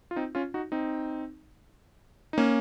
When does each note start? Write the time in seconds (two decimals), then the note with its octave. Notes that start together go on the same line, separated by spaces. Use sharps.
0.11 F4
0.16 C4 D#4
0.35 C#4 F4
0.54 D#4 F#4
0.72 C4 D#4
2.33 D#4
2.38 A#3 C#4